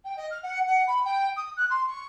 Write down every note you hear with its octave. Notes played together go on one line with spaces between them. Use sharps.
G5
D#5
F6
F#5
F#5
B5
G5
D#6
F#6
C6
C#6